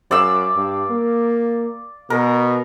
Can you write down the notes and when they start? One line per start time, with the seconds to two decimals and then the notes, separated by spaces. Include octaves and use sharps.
0.11 F#2 D5 F5 E6
0.56 G2
0.90 A#3
2.10 B2 A#4